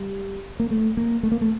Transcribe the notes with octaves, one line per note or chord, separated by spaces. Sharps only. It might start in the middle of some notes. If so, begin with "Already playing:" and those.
Already playing: G3
A#3
A3
A#3
A3
A#3
A3